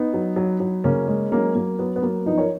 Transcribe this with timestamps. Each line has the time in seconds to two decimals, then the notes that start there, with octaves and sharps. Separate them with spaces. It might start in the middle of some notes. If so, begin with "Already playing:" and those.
Already playing: B3 D#4
0.14 F#3
0.36 F#3
0.60 F#3
0.84 C#3 A#3 C#4
1.07 G#3
1.32 F#3 A#3 C#4
1.55 F#3 A#3
1.79 F#3 B3
1.96 B3
2.02 F#3 A#3
2.26 F3 B3 D#4
2.38 A#4 C#5